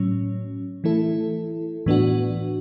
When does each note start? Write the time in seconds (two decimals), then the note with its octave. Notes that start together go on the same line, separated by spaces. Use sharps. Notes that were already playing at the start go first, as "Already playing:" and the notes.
Already playing: A2 F#3 C#4
0.84 E3 A3 E4 A4
1.86 A2 E3 B3 D4 F#4